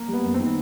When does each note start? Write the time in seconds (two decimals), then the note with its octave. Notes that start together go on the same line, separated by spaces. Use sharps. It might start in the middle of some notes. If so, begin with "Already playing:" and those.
Already playing: A#3
0.08 G3
0.13 B3
0.23 F#2
0.34 D#3 C4